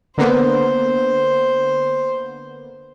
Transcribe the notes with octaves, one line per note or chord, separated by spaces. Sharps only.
D3 A#3 B3 C5